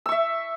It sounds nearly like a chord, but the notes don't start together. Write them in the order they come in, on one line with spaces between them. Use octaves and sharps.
E6 C#6 E5